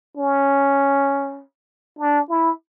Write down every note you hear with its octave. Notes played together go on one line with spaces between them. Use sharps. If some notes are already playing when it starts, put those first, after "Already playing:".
C#4
D4
E4